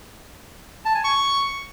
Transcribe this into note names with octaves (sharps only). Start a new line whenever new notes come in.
A5
G#5
C#6